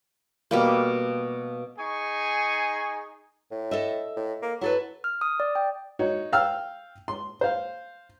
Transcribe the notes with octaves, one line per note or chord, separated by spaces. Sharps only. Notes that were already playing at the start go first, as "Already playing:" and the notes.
B2 G3 A#3
D#4 G#4 G#5 C#6
A2
A4 D#5 E5
A2
A#3
F#3 E4 A4 B4
F6
D#6
D5
G5
D#4 F#4 C#5
F5 G5 E6 F6
C6
C5 F5